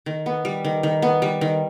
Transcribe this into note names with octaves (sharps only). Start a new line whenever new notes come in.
D#3
B3
G3
D#3
D#3
B3
G3
D#3